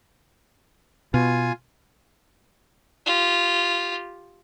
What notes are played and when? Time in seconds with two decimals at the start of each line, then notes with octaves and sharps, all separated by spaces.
1.14 B2 F4 G#5
3.06 F4 G4